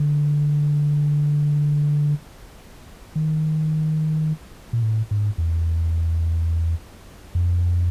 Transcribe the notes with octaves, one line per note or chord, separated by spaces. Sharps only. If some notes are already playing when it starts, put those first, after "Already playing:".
Already playing: D3
D#3
A#2
A2
G#2
E2
F2